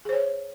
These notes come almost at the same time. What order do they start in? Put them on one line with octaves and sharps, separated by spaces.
G#4 C5 C#5